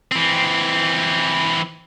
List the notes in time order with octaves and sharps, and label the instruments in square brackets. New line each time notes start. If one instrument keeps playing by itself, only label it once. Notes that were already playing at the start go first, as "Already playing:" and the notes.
[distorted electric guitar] E3 C4